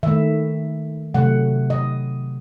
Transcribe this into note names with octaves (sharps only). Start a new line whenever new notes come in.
D#3 A3 E5
C3 F#3 A3 F#5
D#5